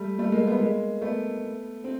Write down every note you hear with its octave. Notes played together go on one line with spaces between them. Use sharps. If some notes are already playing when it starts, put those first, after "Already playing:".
Already playing: G3 A3
G3 A3
G#3 A#3
A3 B3
G#3 A#3
A3 B3
C4